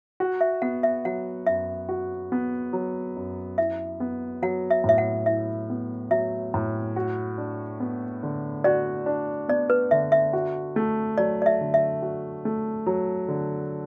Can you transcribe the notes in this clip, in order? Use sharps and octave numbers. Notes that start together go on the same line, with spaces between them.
F#4
E5
B3 F#5
E5
F#3 F#5
F#2 E5
F#4
B3
F#3
F#2
E4 E5
B3
F#3 F#5
E5
A2 E5
F#5
E4 E5
B3
F#3 E5
A2
F#4
D4
B3
D3
F#4 D5
D4
B3 D5
B4
D3 E5
E5
F#4
A3
F#3 D5
D5
E5
D3
E5
F#4
A3
F#3
D3